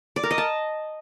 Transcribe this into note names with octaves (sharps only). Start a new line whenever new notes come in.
D5
A#4
D#5
A5